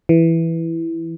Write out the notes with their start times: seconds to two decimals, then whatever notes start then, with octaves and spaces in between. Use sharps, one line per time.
0.09 E3